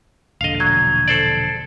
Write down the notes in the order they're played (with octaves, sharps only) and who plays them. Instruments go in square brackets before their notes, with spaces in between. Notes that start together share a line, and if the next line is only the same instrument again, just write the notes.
[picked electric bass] E1 A#1 D3 [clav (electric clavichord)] D#5 F5
[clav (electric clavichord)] F#3 [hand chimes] G#6
[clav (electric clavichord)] A4 C5 D5